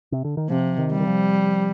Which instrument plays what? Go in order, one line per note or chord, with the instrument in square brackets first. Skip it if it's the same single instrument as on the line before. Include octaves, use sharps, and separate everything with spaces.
[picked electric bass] C3
D3
D#3
[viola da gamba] C3 [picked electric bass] F3
[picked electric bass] D#3
[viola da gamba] G3
[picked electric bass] D#3
F3